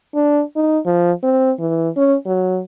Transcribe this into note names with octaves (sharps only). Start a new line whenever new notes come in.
D4
D#4
F3
C4
E3
C#4
F#3